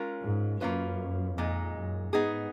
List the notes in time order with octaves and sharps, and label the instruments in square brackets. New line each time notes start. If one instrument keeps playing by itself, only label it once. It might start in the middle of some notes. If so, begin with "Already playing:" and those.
Already playing: [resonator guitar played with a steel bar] G#3 C#4 F4 A#4
[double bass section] G#2
[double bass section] F#2 [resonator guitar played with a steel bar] A#3 C#4 F4 B4
[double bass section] F2 [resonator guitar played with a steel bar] A#2 G#3 D#4
[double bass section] F#2
[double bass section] G#2 [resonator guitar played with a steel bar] B3 D#4 G#4